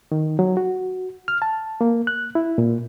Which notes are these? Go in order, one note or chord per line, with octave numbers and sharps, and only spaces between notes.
D#3
F#3
F#4
F6
A5
A#3
F#6
E4
A#2